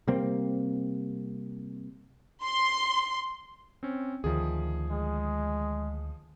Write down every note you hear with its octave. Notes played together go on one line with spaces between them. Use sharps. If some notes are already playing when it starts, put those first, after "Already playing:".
C3 G3 A#3 C4
C6
C4 C#4
D2 D#3 F3 G#4
G#3